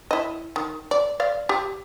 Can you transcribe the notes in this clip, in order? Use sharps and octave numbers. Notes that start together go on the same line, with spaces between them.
E4 D#5
D#3
D5
D5 F5
G4